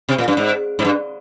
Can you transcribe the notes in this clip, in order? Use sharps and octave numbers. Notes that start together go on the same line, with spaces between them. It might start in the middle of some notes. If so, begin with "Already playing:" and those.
C3
A#2
G2
G#2
G#2
G2